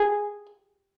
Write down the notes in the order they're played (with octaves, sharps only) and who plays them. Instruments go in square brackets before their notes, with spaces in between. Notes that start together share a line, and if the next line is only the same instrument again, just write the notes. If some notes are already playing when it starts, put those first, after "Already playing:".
Already playing: [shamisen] G#4